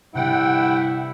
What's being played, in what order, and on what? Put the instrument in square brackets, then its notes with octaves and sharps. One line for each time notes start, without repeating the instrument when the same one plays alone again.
[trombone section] G2 E4 [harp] C3 G3 [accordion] F#5 G5